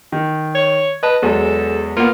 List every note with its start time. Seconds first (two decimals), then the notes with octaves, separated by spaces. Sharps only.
0.12 D#3
0.55 C#5
1.03 B4 D#5 A5
1.22 E2 F#3 G#3 A4
1.97 A#3 B3 F4